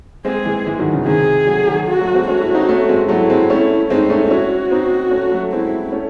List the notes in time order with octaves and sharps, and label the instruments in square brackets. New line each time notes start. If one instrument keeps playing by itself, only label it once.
[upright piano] G#3 C4 [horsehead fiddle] G#4
[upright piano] E3 G#3
E3 G#3
D#3 F#3
C#3 E3
[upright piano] C3 D#3 [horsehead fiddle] G#4
[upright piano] F#3 A3
D#3 F#3
[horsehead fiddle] F#4
[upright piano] F#3 A3
G#3 C4
[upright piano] A3 C#4 [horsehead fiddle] F#4
[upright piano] C#4 E4
C4 D#4
A3 C#4
G#3 C4
[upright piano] F#3 A3 [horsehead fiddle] E4
[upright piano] G#3 C4
A3 C#4
[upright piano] G#3 C4 [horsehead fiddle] D#4
[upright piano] A3 C#4
[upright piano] C#4 E4 [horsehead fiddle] F#4
[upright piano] C4 D#4
A3 C#4
F#3 A3
[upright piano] G#3 C4 [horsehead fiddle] E4
[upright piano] A3 C#4